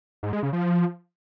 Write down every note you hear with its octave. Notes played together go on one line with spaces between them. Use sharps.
G#2
G#3
C#3
F3